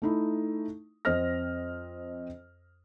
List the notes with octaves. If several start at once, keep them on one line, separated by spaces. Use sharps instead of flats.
A3 D#4 E4
F2 C4 C5 D#5 F6 A#6